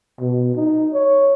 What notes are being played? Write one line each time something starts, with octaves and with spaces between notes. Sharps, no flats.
B2
D#4
C#5